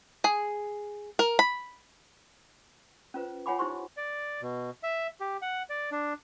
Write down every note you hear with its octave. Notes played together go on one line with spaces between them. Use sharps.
G#4
A#4
B5
C#4 F4 B4 C5
F4 C#5 F#5 G#5 B5 D6
D#4 E4 G4 C5 C6 C#6
D5
B2
E5
G4
F#5
D5
D4